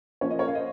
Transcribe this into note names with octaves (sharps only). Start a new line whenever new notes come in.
F3 A#3 C#4 C#5
D#5
A#4 C#5
F5
C5 D#5